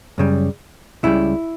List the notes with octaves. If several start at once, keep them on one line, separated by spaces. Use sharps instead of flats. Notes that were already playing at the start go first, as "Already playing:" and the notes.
F#2 C#3 G3
C#2 C#3 G3 E4